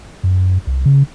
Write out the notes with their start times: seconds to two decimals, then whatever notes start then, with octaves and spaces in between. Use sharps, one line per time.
0.23 F#2
0.67 C2
0.85 C#3